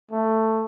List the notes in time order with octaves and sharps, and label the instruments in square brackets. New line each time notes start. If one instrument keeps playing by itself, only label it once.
[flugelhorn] A3